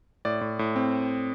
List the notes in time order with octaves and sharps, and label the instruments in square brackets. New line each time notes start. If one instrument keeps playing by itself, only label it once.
[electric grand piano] A2 D5
A2
A2
C4